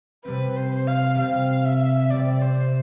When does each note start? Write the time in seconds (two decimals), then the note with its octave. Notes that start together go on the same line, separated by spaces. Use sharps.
0.25 C3 G3 C4 B4
0.56 C5
0.87 F5
1.16 C3 G3 C4 F5
1.64 E5
2.10 C3 G3 C4 D5
2.41 C5